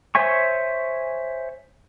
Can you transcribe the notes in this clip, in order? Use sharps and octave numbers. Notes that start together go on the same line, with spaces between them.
C5 C#5 E5 G#5 C#6